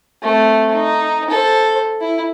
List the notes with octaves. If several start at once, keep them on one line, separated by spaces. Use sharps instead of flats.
A3 C4
D#4
A4 C5
E4